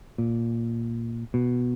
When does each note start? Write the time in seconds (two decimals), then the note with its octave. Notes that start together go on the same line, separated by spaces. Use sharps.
0.18 A#2
1.34 B2